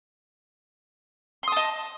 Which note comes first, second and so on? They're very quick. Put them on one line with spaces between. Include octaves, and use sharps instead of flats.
C6 D#6 A5 D#5